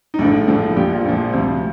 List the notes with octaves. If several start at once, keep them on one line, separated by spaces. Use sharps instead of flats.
D#4
A#1 A2 F3 D4
A#1 A2 F3
A#1 A#2 F3 G4
F4
A#1 A#2 F3
D2 C3 F3